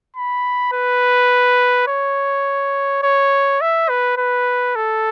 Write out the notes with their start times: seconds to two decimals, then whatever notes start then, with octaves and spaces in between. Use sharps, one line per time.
0.16 B5
0.73 B4
1.88 C#5
3.03 C#5
3.61 E5
3.89 B4
4.17 B4
4.76 A4